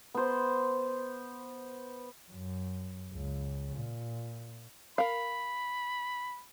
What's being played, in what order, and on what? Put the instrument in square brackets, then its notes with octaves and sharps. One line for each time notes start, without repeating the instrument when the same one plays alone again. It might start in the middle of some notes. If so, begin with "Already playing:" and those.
[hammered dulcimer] B3 C5
[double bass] F#2
C#2
A#2
[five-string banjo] A#4 F5 [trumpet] B5